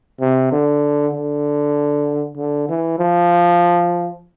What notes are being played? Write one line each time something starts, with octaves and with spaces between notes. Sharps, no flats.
C3
D3
D3
D3
E3
F3